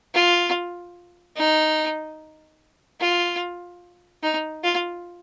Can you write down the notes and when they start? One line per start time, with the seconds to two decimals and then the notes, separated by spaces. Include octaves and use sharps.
0.14 F4
1.37 D#4
3.01 F4
4.23 D#4
4.64 F4